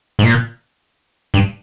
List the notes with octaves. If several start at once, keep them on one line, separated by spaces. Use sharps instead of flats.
G#2
A#2
G2